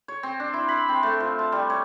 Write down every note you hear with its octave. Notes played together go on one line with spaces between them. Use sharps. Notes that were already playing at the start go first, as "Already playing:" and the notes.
C#5
C4
D4
E4
B5
C4
A3
F3
A5
G3
C#5